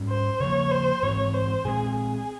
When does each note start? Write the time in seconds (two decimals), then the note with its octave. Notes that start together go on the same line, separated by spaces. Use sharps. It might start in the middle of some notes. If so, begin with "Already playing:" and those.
Already playing: G#2 G3 C#4
0.09 C5
0.40 C#3 F3 A#3 C#5
0.72 C5
1.03 G#2 E3 G#3 C4 C#5
1.34 C5
1.65 A#2 G#3 C4 G#4
1.96 G#4